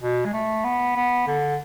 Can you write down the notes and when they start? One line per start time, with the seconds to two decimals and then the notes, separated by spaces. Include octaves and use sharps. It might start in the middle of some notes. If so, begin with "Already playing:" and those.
0.02 B2
0.25 G#3
0.33 A3
0.64 B3
0.96 B3
1.27 D3